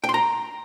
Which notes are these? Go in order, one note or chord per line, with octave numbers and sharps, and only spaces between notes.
G5
C6
A#5